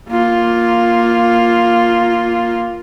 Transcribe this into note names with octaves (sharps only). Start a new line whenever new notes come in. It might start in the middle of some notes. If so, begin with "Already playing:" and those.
A#3 F4